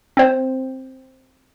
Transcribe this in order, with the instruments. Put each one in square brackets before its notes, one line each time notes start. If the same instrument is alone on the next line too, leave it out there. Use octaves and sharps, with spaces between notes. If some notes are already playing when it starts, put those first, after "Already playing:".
[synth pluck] C4 C5